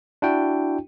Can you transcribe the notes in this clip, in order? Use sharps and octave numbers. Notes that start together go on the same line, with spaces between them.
D4 E4 F#4 G5